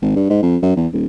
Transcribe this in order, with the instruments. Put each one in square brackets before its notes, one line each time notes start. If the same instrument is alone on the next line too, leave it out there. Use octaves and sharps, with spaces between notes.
[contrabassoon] G#1
G2
G#2
F2
F#2
E2
D#1